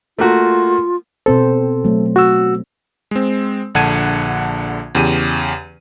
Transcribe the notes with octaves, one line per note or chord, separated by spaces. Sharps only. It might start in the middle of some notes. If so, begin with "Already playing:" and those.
A3 A#3 F4 F#4
B2 C4 A4 C5
F#3 A3
F#4 E6
G#3 C4
A#1 D3 F#5 A5 G#6 D#7
E2 C#3 G4 D#7